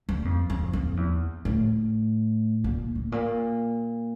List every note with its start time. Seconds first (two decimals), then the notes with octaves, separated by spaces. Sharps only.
0.09 G2
0.25 F2
0.50 F2
0.73 F2
0.97 E2
1.45 A2
2.64 A#2
2.95 A2
3.12 A#2